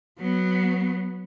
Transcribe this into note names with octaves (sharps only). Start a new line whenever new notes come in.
F#3 B3